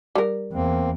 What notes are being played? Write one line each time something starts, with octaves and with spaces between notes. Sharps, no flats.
G3 A#4
E2 A#3 C4